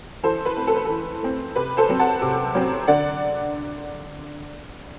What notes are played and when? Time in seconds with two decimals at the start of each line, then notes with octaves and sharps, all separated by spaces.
0.23 E3 A4 C5
0.45 B4
0.56 A3 C4
0.67 A4
0.76 B4
0.85 E3 A4
1.22 A3 C4
1.56 C3 B4
1.77 A4 C5
1.89 F#3 C4
2.00 F#5 A5
2.22 C3
2.55 F#3 C4
2.87 D3 D5 F#5